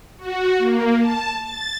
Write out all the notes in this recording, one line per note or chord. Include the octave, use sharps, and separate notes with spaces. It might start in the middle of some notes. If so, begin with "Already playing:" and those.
F#4
A#3
A5
A6